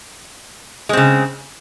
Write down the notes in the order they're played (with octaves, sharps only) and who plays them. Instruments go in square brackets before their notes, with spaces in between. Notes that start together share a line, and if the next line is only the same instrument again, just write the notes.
[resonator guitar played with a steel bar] G#3
C4
C#3